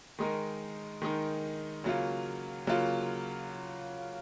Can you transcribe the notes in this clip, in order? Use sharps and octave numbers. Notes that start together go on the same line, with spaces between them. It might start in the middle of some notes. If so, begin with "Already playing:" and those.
D#3 G#3 D#4 A#4
D#3 G#3 D#4 A#4
C#3 F#3 A#3 F4
C#3 F#3 A#3 F4